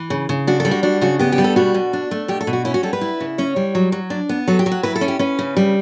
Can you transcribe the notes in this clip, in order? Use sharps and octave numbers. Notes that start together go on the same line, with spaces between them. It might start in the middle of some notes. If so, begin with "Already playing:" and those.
Already playing: E3
C#3
C#3
D4 F#4
A4
G3
F#4
D4 F#4
C#3 F#4
B3 G4
G4
G3
A4
B2 F#4
B2
D4
A3
B2 G4
A4
B2
F#4
C#4 E4
F#4
G3 A4
B4
E4
C#3
C#4 C#5
G3
F#3
F#3
D4
B3
F#3 A4
G4
F#3
F#4
E4 B4
A4
C#4
G4
C#4 B4
C#3
G3